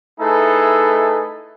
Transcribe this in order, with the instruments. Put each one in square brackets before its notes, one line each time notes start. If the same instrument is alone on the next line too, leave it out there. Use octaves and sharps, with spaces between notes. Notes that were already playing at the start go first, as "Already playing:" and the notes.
[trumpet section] A3 D#4 E4 G#4 A4 B4